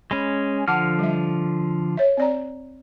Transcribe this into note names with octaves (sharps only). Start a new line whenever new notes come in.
G#3 C#4 B5
D3 F3 F#5 A5 D6 F6
G3 E5
C#5 E5
C4 D5 A#5